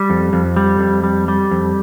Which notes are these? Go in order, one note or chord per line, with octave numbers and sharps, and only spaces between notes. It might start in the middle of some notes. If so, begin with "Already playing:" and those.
Already playing: G3
F2
F2
G3
F2
G3
G3
F2